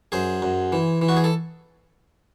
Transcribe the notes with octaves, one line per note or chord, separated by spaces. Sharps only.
F#2 G#4 C5
F#2
E3
E3
F#4
G#4
A4